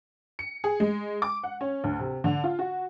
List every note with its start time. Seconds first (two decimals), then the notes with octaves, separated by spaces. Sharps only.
0.39 C#7
0.64 G#4
0.80 G#3
1.22 D6
1.44 F#5
1.61 C#4
1.84 D2
1.99 C3
2.24 D3
2.44 F4
2.59 F#4